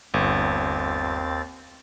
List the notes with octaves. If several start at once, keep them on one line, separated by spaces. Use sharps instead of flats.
G1 D#2 C4 A6